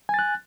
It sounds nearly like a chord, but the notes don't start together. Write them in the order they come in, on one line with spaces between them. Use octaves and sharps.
G#5 A6 F#6